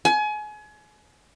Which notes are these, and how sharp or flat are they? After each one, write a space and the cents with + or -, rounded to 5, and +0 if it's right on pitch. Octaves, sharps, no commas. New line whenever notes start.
G#5 +30